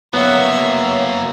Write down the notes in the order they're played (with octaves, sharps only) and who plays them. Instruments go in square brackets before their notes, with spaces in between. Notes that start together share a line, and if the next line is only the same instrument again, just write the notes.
[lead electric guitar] F#3 A#3 [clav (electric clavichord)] B3 F#5 [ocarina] C#5 [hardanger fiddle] E5